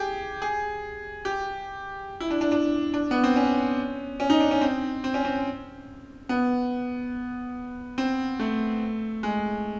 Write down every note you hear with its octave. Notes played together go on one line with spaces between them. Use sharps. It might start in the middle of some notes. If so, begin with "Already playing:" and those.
Already playing: G4 G#4
G#4
G4
E4
D4
D4
D4
D4
B3
C4
C#4
C#4
D#4
D4
C#4
C4
C4
C#4
C4
B3
C4
A3
G#3